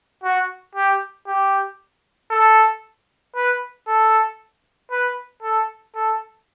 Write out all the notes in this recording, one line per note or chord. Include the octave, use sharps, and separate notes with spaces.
F#4
G4
G4
A4
B4
A4
B4
A4
A4